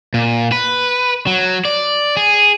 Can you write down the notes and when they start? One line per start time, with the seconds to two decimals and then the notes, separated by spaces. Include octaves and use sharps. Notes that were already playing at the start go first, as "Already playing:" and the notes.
0.14 A#2
0.52 B4
1.27 F#3
1.65 D5
2.17 G#4